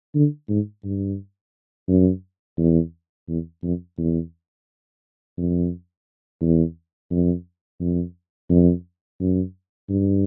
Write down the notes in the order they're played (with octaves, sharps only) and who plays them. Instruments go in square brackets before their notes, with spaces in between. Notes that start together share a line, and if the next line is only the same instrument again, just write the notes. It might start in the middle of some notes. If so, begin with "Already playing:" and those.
[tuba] D3
G#2
G2
F#2
E2
E2
F2
E2
F2
E2
F2
F2
F2
F#2
G2